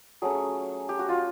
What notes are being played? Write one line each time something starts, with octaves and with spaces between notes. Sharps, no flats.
F#3 A3 C#4 G#4
G4
F#4
F4